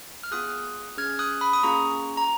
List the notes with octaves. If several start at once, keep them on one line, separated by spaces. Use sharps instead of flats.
F6
B3 F4 G#4 D#6 F#6
C#4 G#4 F6 G#6
D#6 F#6
B5 D#6
D#6
A#3 C#4 F4 G#4 A#5 C#6
A#5